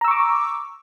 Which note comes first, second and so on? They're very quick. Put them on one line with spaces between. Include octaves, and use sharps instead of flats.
A#5 E6 C#6 D6